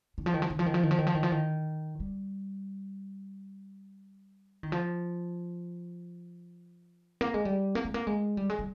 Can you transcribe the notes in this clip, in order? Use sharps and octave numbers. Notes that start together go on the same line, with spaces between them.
D#3
F3
D#3
F3
D#3
F3
D#3
F3
D#3
F3
D#3
F3
D#3
F3
D#3
G3
D#3
F3
A#3
G#3
G3
A#3
G#3
A#3
G#3
G3
G#3
G3